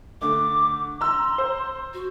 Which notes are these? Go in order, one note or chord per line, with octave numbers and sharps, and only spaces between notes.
D3 A3 D6
A#5 C6 E6
C5
F#4